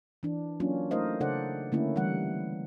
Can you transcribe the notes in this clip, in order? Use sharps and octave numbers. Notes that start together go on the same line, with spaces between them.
E3 D4
F#3 A#3 C#4 D4 F4
A3 D#4 A#4 C5 D#5 F5
C#3 D4 A4 C5 D5 F#5
D3 A3 A#3 C#4 E4
E3 G3 F#5